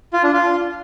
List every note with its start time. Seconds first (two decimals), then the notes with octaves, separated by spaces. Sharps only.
0.13 F4
0.23 D4
0.33 F4